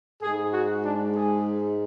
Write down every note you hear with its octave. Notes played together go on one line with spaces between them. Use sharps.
G#2 G#3 G#4
F#4
D4
G#4